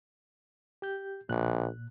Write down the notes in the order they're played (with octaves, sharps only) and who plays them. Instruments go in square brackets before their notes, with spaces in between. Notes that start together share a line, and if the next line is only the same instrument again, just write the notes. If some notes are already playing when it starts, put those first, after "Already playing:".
[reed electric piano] G4 G6
[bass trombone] A#1 [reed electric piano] A#2 F#6